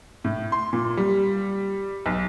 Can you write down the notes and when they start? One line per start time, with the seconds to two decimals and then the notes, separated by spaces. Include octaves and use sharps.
0.24 A2
0.52 C6
0.73 A#2
0.97 G3
2.06 B1